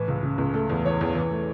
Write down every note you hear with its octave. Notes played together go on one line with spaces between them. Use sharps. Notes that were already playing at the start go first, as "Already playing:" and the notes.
Already playing: A2 E3 B4
C#2
C#3
C#2
A3 A4
E2
E3 C#5
E2
E3
A3